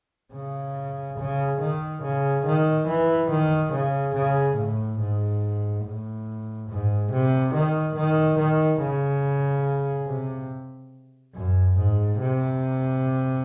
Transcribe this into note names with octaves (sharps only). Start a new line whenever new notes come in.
C#3
C#3
D#3
C#3
D#3
E3
D#3
C#3
C#3
A2
G#2
A2
G#2
C3
D#3
D#3
D#3
C#3
C3
F#2
G#2
C3